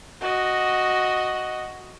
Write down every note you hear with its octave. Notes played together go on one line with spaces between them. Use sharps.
F#4 D#5